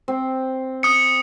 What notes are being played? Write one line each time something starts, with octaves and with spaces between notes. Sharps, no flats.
C4
D#6 C#7